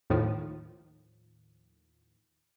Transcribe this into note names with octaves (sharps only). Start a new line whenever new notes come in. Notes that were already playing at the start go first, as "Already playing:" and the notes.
D#2 A2 D#3 F3